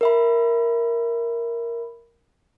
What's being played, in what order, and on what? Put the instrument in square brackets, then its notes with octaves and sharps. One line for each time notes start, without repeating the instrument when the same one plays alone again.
[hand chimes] A#4 E5 B5